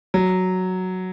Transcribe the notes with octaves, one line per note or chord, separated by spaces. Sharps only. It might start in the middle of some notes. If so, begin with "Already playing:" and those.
F#3